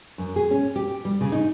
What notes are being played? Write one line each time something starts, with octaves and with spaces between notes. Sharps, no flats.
F#2
G#4
C#4
G4
G3
C#3
D#4